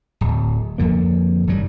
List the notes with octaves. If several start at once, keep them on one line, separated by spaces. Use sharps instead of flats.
D1
F2 D3 A#3
F#1 D#3 F#3 G3